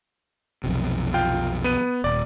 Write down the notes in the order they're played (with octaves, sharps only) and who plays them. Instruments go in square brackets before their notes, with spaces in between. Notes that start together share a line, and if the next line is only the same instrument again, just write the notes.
[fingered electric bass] B1 F2 C3
[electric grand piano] F4 G5
B3 D#7
[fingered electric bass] D#1 [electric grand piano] D5